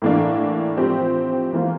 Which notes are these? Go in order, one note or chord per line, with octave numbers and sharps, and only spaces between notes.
A2 E3 A#3 D4
F3 C4 G4
E3 A#3 F4